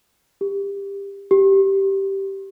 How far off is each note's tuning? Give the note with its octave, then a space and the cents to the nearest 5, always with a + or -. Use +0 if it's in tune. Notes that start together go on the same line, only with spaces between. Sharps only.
G4 +20
G4 -10